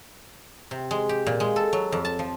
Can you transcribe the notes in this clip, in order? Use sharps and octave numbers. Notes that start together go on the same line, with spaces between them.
C3
G#3
G4
A#2
G#3
A4
F#3
F2
A5
F3